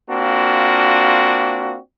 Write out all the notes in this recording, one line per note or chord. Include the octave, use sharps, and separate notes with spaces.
A#3 C4 D4 F4 F#4